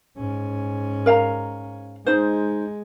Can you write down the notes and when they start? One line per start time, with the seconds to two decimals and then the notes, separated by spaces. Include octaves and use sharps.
0.17 G#2 C#4
1.06 A#4 F5 A#5
2.06 G#3 D#4 C5